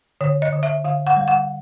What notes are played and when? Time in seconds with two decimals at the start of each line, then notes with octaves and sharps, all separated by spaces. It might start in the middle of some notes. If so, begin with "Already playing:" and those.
0.21 D3 C#5
0.42 D#5
0.53 D3
0.63 E5
0.85 D3 F5
1.07 F#5
1.17 G3
1.28 F#5